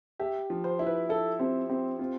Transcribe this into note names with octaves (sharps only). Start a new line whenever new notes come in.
G4 E5
F3
C5
E4
B4
E4 A4
C4 G4
C4 G4
C4 F4